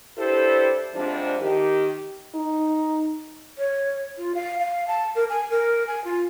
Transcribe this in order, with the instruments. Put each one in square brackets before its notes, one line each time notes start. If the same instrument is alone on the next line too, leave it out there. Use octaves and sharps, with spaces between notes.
[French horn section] D4 E4 G4 A4 B4 C5
G#2 C3 F3 G3 D4
D#3 G4
[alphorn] D#4
[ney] C#5
F4
F5
F5
A5
A#4
G#5
A#4
G#5
F4